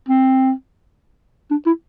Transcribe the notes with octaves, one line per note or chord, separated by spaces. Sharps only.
C4
D4
E4